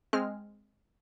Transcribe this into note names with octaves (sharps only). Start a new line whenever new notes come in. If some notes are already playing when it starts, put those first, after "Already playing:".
G#3 C4 F6